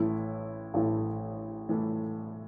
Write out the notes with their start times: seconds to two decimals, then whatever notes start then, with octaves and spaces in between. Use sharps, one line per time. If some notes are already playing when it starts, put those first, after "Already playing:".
Already playing: A1 A2 E3 A3 E4
0.74 A1 A2 E3 A3 E4
1.69 A2 E3 A3 E4